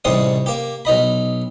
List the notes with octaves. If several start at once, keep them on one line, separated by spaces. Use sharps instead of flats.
A1 G#2 C3 G3 C6 D#6
A#3 G4
B1 D#4 D#5 B5